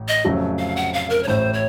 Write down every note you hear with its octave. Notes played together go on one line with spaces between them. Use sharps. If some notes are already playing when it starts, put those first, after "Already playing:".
Already playing: A1 A2
D#5
F1 F2 C#3 F#3 A3
F5
F#5
F5
A#4
C#5
A1 A2 A3 C5
C#5